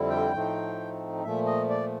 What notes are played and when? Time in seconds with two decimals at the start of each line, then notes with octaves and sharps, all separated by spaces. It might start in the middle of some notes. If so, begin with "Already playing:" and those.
Already playing: F2 D3 G3 C4 E4
0.10 G5
0.33 A2 F3 A3 C4 D#4
1.24 A#2 F3 A3 E5
1.46 D#5
1.69 D5